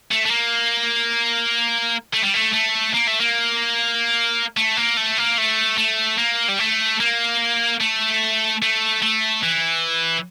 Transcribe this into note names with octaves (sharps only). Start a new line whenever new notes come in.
A3
A3
A#3
A3
G3
A3
A3
A#3
A3
A#3
A3
A#3
A3
A#3
A3
A3
A#3
G3
A3
A#3
A3
A3
A3
E3